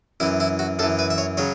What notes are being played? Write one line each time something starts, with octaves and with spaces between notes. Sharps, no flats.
F#2 E3 E4
E4
F#4
F#2 E3 A4
B4
E5
C#5
C#3 F#3 C#5